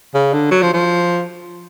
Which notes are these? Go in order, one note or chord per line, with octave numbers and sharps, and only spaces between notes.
C#3
D3
F#3
F3
F3